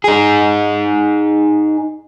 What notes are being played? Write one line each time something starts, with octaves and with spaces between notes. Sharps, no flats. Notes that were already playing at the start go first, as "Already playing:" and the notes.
D#4 G#4